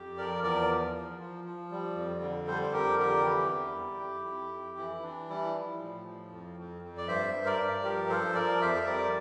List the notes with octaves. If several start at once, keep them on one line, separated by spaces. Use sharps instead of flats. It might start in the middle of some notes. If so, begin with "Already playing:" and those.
Already playing: F2 G4
F3 A#4 D5
E2 A#4 D5
F3
F3
F3
F3
G3
F2
D3
G3 A4 C5
C5
F2 G4 A#4
D3 G4 A#4
E3 E4 G4
E2
G3
F2
F2
F2
E3 E4
E3 D4
G3 E4
F3
A2
F3
F2
F2
F2
D5
G2 C5 E5
G2
A#4 D5
G2
F3 G4 A#4
F3 A4 C5
F3 A#4 D5
F2 C5 E5
C5
G3 A#4 D5